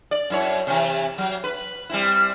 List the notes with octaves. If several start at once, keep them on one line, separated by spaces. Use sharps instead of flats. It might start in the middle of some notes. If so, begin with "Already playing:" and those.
D5
F#2 E4 C#5
C3 E3
F#3
B4
G3 C4 E4